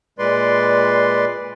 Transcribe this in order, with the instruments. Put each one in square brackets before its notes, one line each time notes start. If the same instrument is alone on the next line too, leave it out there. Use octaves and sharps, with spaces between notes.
[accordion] A#2 G#3 B4 D5 C6